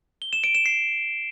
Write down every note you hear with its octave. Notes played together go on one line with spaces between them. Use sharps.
G7
E7
D7
E7
C7